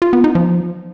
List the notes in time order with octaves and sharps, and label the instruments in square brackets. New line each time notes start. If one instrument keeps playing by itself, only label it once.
[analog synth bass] F4
B3
D#4
F3